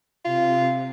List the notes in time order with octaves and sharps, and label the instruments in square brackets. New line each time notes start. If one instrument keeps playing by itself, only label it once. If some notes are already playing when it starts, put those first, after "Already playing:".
[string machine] C3 [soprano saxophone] F4